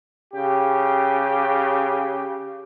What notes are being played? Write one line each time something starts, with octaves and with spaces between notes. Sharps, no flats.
C#3 G4